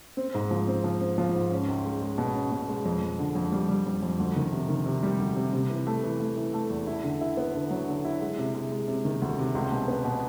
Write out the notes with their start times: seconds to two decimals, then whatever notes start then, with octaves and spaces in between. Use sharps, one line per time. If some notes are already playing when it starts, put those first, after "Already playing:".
0.17 C4
0.34 G#2
0.51 F3
0.68 C4
0.84 F3
1.01 C4
1.18 F3
1.35 G#2
1.51 C#4
1.68 C#2
1.85 G#3
2.02 G#3
2.18 B2
2.35 C#4
2.52 B2
2.69 G#3
2.85 F2
3.02 F2
3.19 D3
3.35 F2
3.52 G3
3.68 G3
3.85 F2
4.02 F2
4.20 D2
4.36 D#3
4.52 C3
4.69 D#3
4.86 C3
5.03 G3
5.19 D2
5.36 C3
5.53 C3
5.70 E3
5.87 A3
6.03 E3
6.20 A3
6.37 E3
6.54 A3
6.70 E2
6.87 E4
7.04 D3
7.21 E4
7.37 B3
7.55 D3
7.71 F#3
7.88 D3
8.05 E4
8.21 G#3
8.38 C3
8.55 G#3
8.71 G#3
8.88 C3
9.05 D#3
9.22 D2
9.39 C3
9.55 C#2
9.71 B2
9.88 B3
10.05 B2